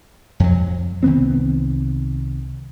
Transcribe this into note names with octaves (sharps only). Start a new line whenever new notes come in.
F2 F#3
C2 D#3 B3 C4